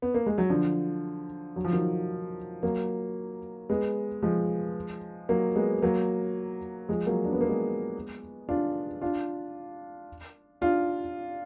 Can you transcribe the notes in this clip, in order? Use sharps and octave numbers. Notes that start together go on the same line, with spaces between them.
B3
A#3
G#3
F#3
D3 F3
F#3
F3
D#3 F#3
F#3 A#3
G#3 B3
F3 G#3
F#3 A#3
G#3 B3
F#3 A#3
F3 G#3
F#3 A#3
D4
B3
A#3
G#3 B3
D4 F4
D4 F4
D4 F4